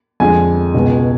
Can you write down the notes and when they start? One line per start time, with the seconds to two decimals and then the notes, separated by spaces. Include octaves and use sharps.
0.20 F2 D3 G#3 G#5
0.74 C#2 B2 G#3